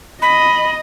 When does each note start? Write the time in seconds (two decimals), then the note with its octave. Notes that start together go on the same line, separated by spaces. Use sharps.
0.22 D#5 B5